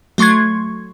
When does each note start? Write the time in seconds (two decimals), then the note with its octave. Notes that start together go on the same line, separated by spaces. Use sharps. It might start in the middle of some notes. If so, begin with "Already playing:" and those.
0.18 F#3 A3 C6 C#6 G#6